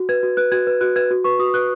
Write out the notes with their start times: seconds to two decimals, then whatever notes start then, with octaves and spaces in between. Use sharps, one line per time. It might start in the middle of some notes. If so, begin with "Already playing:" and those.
Already playing: F#4
0.09 B4 G#6
0.23 F#4
0.37 B4 F#6
0.52 F#4 G#6
0.67 B4
0.81 F#4 F#6
0.96 B4 G#6
1.10 F#4
1.24 B4 C#6
1.39 F#4 D#6
1.54 B4 F#6